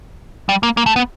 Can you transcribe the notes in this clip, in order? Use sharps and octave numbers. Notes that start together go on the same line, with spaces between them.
G3
A#3
A#3
A3
B3